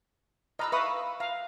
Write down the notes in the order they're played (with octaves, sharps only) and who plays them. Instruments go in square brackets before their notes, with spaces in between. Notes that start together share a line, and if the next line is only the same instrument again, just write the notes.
[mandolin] F4 B4 E6 [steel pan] D#5 A#5
[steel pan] B4 E5 D#6 [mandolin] F5 B5 C#6
[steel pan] F5 [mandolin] A#5